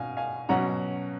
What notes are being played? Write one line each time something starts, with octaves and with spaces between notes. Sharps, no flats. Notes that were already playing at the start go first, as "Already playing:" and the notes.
Already playing: B2 F5 G#5
F5 G#5
B2 F#3 C#4 F#5 A#5